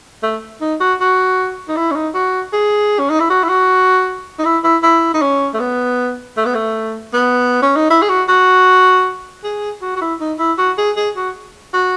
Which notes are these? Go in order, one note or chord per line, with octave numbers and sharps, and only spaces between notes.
A3
D#4
F#4
F#4
D#4
E4
C#4
D#4
F#4
G#4
C#4
D#4
E4
F#4
E4
F#4
D#4
E4
E4
E4
D#4
C#4
A3
B3
A3
B3
A3
B3
C#4
D#4
E4
G#4
F#4
F#4
G#4
F#4
F#4
E4
D#4
E4
F#4
G#4
G#4
F#4
F#4